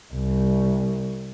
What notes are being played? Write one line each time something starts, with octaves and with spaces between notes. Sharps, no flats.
C2